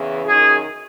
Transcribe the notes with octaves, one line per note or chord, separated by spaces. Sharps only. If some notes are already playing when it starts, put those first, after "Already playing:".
Already playing: E2 C#3 E3
F#2 D#3 G#4